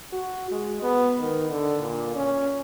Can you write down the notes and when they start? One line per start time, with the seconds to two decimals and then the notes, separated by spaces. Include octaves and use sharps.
0.13 F#4
0.51 G#3
0.82 B3
1.19 D#3
1.50 D3
1.81 A#2
2.15 C#4